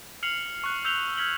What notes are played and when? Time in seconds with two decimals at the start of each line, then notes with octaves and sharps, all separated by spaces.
0.23 F6 C7 C#7 F7 F#7
0.64 C#6 F#6
0.85 E6 G6 B6 F7 G7
1.17 F6 G#6 B6 C#7 F#7 G7